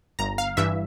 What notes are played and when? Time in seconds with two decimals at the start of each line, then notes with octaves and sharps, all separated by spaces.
0.19 G1 A#5
0.38 F5
0.57 G2 E3 E5